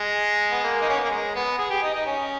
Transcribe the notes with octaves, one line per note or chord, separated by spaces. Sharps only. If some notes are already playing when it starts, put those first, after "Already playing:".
Already playing: G#3
B3
A#3
D#4
C#4
B3
A#3
G#3
B3
G#4
G4
D#4
D#4
C#4